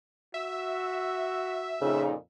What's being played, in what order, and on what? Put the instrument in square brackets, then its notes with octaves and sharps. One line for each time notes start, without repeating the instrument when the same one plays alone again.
[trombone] F#4 [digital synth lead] E5
[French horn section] F2 A#2 D#4 [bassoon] C#3